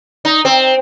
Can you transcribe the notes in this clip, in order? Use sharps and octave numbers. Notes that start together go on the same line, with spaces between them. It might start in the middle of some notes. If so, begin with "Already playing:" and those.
D#4
C4